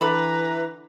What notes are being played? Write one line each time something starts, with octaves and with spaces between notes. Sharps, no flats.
D3 E3 A4 B4 A#5 B5